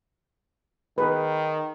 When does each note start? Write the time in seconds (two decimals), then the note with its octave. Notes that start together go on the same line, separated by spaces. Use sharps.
0.98 D#3 G#4 B4